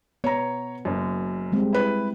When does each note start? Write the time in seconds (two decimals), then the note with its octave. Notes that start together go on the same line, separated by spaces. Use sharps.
0.24 B3 C#5 A#5
0.85 F#1 F#2
1.52 G3 G#3 C4
1.73 E4 B4